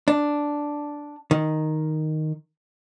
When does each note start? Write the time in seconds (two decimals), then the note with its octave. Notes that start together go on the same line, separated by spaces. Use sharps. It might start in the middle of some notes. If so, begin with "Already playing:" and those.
0.08 D4
1.31 D#3